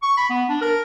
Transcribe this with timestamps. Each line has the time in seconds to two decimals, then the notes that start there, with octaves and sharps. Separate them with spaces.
0.02 C#6
0.17 B5
0.30 B3
0.49 D4
0.62 A#4